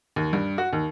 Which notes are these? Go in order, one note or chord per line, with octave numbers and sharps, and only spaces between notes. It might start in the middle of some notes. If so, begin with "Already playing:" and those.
D#2
G2
F#4
D#2